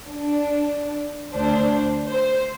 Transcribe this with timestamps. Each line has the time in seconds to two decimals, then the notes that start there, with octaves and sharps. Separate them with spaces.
0.11 D4
1.35 D2 D4 C5
2.10 C5